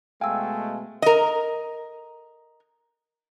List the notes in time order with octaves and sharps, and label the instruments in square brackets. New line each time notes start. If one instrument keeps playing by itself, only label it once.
[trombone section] B2 G#3 A3 [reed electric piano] F5 G#5 [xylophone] G5 E6
[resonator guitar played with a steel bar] A#4 D#5